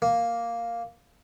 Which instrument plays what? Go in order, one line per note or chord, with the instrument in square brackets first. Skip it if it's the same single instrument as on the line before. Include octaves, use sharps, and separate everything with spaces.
[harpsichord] A#3